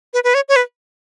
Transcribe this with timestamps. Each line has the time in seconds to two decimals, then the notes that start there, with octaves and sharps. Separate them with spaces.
0.14 B4
0.24 B4
0.34 C#5
0.49 C#5
0.56 B4